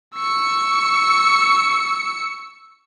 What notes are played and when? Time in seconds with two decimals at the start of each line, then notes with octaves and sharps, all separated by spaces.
0.15 C#6 E6 C#7